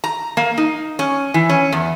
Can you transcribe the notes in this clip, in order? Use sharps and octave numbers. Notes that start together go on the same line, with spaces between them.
A#5
A#3
D#4
C#4
E3
C#4
E2